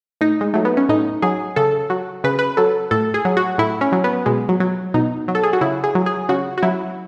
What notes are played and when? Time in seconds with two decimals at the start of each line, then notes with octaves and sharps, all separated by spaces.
0.21 A2 D#4
0.41 G#3
0.54 F#3 A3
0.65 B3
0.77 C#4
0.89 A2 D#4
1.22 F#3 G#4
1.56 C#3 A4
1.90 F#3
2.24 C#3 B4
2.39 B4
2.57 F#3 A4
2.91 A2 A4
3.14 G#4
3.25 F#3
3.37 F#4
3.58 A2 E4
3.81 C#4
3.92 F#3
4.04 B3
4.26 B2 G#3
4.49 F#3
4.60 F#3
4.94 B2 D#4
5.28 F#3
5.35 A4
5.43 G#4
5.53 F#4
5.61 C#3 E4
5.84 G#4
5.95 F#3
6.06 G#4
6.29 C#3 F#4
6.58 F#4
6.62 F#3 E4